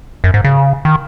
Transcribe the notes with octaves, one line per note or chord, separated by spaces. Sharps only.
F#2
G#2
C#3
D#3